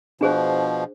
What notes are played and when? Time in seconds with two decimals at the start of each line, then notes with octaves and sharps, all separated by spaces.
0.21 B2 F3 D4 G#4 C5